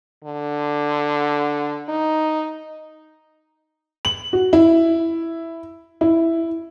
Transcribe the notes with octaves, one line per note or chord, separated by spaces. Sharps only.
D3
D#4
F#7
F#4
E4
E4